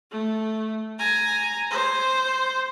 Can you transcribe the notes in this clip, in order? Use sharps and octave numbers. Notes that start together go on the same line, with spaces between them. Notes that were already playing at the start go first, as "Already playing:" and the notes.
A3
G#5 A#5
C5